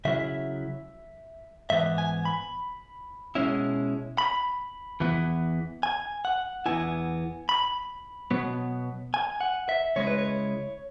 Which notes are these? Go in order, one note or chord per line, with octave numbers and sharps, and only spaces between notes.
C#3 F#3 E4 E5
G#2 E3 B3 E5
G#5
B5
B2 G#3 C#4 E4
B5
E2 E3 B3 E4
G#5
F#5
E2 E3 B3 E4 G#5
B5
B2 F#3 B3
G#5
F#5
E5
C#3 G#3 E4 C#5
B4
C#5